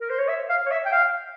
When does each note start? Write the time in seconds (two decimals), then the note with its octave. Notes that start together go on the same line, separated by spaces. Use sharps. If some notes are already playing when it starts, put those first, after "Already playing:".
0.01 A#4
0.10 C5
0.19 C#5
0.28 E5
0.49 F5
0.66 C#5
0.71 E5
0.86 G5
0.92 F5